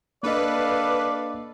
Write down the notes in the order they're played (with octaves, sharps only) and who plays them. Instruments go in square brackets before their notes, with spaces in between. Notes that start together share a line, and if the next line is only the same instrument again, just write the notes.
[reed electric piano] A#3 D4 D#5 [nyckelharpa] A4 F5 [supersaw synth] B4 [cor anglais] D5